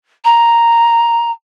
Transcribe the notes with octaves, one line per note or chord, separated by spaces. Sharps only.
A#5